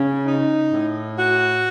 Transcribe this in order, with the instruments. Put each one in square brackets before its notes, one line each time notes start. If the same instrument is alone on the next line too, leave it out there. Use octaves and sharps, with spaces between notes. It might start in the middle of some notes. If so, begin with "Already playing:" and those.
Already playing: [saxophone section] C#3 [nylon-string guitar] C#4
[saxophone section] D#4
A2
F#4